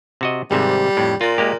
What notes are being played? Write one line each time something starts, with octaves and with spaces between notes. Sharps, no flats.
C3 F#4 D#5
G#1 G#2 C3 G3
F2 A2
A#2 F4
G#3 A#3 G4